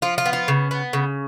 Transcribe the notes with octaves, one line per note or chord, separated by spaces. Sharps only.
F3 F4
F4
B3
F4
C#3
B3
C#3